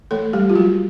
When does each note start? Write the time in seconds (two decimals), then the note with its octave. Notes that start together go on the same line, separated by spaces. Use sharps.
0.11 E3 A3 A4
0.33 G3 G#3 G4
0.49 F4
0.55 F#3 G#3 F#4